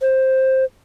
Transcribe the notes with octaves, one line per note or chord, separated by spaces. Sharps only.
C5